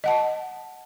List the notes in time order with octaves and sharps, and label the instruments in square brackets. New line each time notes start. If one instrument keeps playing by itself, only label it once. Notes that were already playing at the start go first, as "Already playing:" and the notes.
[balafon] D#5 F#5 A5